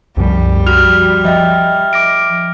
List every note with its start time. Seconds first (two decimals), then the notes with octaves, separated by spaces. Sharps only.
0.17 C2 F#2 F3 G3
0.67 F#4 F6 F7
1.25 F3 D#5 E5 G5
1.93 D6 A#6 D7